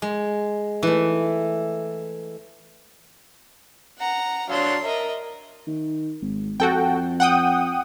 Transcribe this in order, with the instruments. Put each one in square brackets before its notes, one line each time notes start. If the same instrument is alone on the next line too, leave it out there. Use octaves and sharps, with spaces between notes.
[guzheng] G#3
E3 A3
[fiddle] F#5 A#5
[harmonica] F#3 D4 F5 [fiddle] C#5 C6
[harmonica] A#4 [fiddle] D#5 E5
[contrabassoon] D#3
G#1
[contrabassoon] F2 [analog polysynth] F#4 A4 G5
[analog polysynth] F#5 G5 D#6